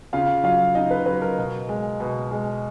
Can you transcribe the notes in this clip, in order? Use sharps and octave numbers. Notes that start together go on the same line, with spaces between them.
C#3 F4 F5
F#3 F4 F5
C#3 D#4 D#5
B4
F#3 B4
A#4
B2
G#3
B2
G#3